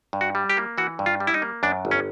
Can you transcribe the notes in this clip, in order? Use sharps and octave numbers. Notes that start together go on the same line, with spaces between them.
G2
F#4
G3
G4
A#3
E3 F#4
G2
F4
G3
E4
D#4
A#3
F#2 D4
G1
C#4